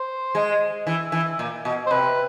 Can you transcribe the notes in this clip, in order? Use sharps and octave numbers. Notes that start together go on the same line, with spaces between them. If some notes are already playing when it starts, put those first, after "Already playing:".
Already playing: C5
G#3
E3
E3
A#2
B2
C5
C3 B4